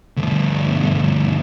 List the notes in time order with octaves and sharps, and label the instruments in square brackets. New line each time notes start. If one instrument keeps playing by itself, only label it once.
[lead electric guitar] D2 G2